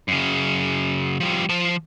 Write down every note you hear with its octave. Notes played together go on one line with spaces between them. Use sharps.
F#2 C#3
F3 G3
F3 A5